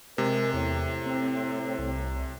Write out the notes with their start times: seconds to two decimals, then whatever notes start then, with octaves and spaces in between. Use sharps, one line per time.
0.18 C3 G#3 A#4
0.54 E2 A2
1.06 C4
1.79 C2